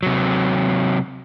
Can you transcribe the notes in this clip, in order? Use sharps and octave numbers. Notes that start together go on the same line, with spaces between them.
C3 F#3